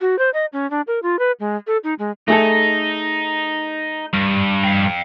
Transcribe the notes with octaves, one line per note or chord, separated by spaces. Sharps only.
F#4
C5
D#5
C#4
D4
A#4
F4
B4
G#3
A4
D#4
G#3
A3 D#4 G#4 A4
G2
F5 G5